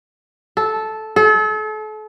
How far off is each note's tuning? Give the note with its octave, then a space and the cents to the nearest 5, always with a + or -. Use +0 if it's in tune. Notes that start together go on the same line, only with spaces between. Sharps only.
A4 -10
A4 -40